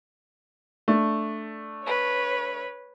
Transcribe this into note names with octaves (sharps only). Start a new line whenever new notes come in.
A3 D4
B4 C#5